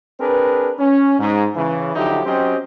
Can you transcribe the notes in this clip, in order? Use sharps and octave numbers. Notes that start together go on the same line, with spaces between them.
C4 D4 G#4 A#4 B4
C#4
G#2
C#3 E3
D3 F3 F#3 D#4 E4 G4
F#3 C4 C#4 G4 C5 D#5